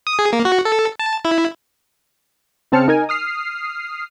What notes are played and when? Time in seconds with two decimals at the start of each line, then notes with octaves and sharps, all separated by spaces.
0.07 D#6
0.19 G#4
0.33 A#3
0.45 F#4
0.65 A4
0.99 A5
1.25 E4
2.72 C#3 C4 A5 F6 C#7
2.88 D#4 A#4 G#5
3.09 D#6 F6 C7